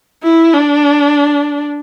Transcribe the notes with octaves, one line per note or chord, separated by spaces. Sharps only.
E4
D4